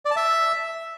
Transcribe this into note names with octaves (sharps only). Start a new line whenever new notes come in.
D5
A5
E5